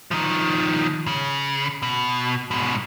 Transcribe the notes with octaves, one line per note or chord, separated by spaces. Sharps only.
D#3 F3
C#3
B2
G#2 B2